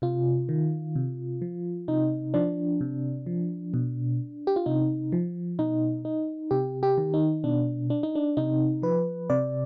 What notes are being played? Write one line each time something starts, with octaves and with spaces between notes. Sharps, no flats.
C3 F4
D#3
C3
F3
C3 D#4
F3 D4
C3
F3
B2
G4
F4
C3 D#4
F3
B2 D#4
D#4
C3 G4
G4
D#3
D#4
B2 D4
D4
D#4
D4
C3 D#4
F3 B4
C3 D5